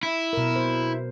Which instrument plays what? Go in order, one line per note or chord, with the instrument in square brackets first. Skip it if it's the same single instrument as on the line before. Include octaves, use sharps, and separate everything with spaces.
[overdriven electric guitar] E4
[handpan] B2 A#4
C5